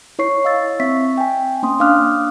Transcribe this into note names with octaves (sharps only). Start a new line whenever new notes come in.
E4 C#5 C#6 C7
D#5 F5 E6 A6
C4 E5 C#6 B6
G5 G#5
A#3 C#4 C6 D#6
D4 F5 D6 D#6 F6 F#6